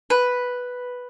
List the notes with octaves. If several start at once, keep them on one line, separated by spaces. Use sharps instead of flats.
B4